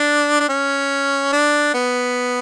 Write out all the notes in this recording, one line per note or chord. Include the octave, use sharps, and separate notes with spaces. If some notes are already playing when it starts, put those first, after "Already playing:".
Already playing: D4
D4
C#4
D4
B3